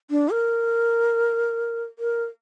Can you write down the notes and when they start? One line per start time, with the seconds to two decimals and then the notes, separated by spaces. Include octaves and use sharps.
0.10 D4
0.32 A#4
1.99 A#4